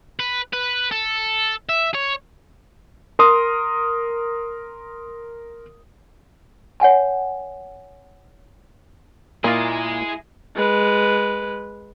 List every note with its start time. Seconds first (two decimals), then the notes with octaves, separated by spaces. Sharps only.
0.19 B4
0.53 B4
0.91 A4
1.69 E5
1.94 C#5
3.19 A#4 C6 D#6
6.80 C#5 F#5 G#5 A5
9.44 A#2 A#3 E4 F4 G#4 D#5
10.56 G#3 B4